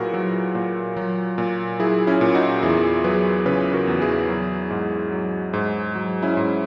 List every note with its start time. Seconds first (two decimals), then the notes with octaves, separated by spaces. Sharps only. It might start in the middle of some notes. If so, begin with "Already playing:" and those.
Already playing: A#2 F#3 E4 F#4 G#4 A#4 B4
0.14 F#3
0.55 A#2
0.97 F#3
1.38 A#2
1.79 F#3 E4 G#4
2.07 C#4 E4
2.21 A#2
2.35 D#4 F#4
2.63 E2 E4 G#4
3.04 F#3 G#4 B4
3.46 C#3 G#4 B4
3.73 F#4 A#4
3.87 E2
4.01 E4 G#4
4.29 F#3
4.70 G#2
5.12 F#3
5.53 G#2
5.95 F#3
6.22 C#4 E4
6.37 G#2